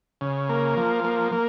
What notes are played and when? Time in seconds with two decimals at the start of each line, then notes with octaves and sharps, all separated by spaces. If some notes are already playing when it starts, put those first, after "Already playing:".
0.21 C#3
0.49 A#3
0.77 F3
1.04 A#3
1.32 A#3